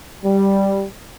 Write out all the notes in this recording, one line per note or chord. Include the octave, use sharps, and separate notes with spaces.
G3